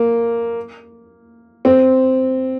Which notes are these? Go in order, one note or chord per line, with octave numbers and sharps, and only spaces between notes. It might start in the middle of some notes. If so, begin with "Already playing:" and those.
Already playing: A#3
C4